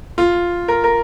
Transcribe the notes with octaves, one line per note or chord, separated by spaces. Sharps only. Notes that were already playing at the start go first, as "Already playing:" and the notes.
F4
A#4
A#4